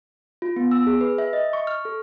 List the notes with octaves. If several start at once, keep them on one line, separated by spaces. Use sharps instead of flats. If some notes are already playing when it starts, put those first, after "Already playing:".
F4
B3
E6
G#4
B4
E5
D#5
C#6
F6
A4